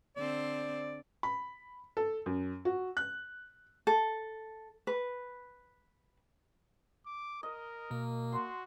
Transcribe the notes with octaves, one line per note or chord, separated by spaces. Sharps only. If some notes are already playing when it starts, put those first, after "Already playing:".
D3 C4 C5 D5
B5
A4
F#2
F#4
F#6
A4
B4
D6
A#4 D#5
B2 A#3
F#4 C6